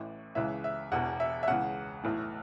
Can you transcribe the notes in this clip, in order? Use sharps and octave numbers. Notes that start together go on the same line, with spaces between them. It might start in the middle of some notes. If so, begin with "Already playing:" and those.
Already playing: A1 A2 E3
C#2 C#3 E3 E5
E5
E1 E2 B2 F#5
E5
E5
C#2 C#3 E3 F#5
B1 A2 E3